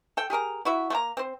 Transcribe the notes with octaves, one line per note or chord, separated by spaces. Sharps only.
A4 G5
G4 G#4 A#4 A#5
E4 F#4 E5
A3 A#3 A#5
C4 C5